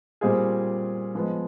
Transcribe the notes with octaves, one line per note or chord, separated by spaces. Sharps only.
A#2 G3 C4 F4 G#4
F3 G#3 B3